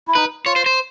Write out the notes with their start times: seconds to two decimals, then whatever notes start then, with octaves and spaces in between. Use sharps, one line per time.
0.08 E4
0.15 D#4 B4
0.45 F4 C#5
0.56 C5
0.66 C5